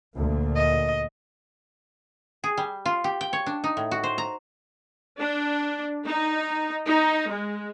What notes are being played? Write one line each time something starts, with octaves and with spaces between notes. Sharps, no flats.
D2 A#2
D#5
G#4
G3
F4
G4
G5
C#5
D4
D#4
A2
F#4
C5
A#5
D4
D#4
D#4
G#3